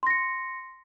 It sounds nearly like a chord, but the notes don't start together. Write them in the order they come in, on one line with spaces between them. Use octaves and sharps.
C6 A#6 C#7